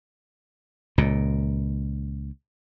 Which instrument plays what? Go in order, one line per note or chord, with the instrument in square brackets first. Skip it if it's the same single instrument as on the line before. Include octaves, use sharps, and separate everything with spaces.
[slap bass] C#2 A#2